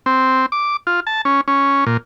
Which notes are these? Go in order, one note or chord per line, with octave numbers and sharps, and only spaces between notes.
C4
D6
F4
A5
C#4
C#4
A#2